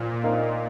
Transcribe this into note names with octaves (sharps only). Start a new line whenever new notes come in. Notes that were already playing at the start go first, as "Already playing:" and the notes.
Already playing: A#2 F3
C4 D#4 A#4 F5